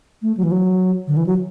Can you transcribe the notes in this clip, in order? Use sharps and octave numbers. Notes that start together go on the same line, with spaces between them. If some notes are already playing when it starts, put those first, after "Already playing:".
A3
F#3
E3
F#3
D3
E3
F#3